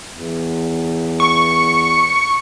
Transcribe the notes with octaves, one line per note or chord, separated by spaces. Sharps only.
E2
C#6